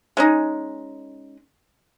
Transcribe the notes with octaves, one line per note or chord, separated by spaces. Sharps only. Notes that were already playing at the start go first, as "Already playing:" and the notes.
G#3 C#4 D#4